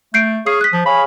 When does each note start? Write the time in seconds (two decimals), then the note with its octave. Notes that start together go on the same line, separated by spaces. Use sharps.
0.14 A3 G6 C7 D7
0.46 G#4 C#5 F5 D#6 C7
0.61 D#6 F#6 B6
0.73 F3 B6
0.86 G#4 C#5 F5 B5